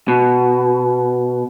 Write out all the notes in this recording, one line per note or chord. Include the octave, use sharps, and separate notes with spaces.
B2